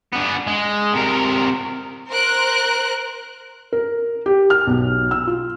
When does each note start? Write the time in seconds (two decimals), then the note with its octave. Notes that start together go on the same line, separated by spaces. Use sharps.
0.13 D3 B3
0.47 G#3
0.94 C3 A#4
2.10 A#4 C5 A#5 F#6 D7
3.73 A#4
4.26 G4
4.50 F6
4.67 B1
5.11 E6
5.27 F4